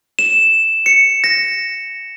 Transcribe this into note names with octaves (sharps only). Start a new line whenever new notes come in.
E7
C#7
A#6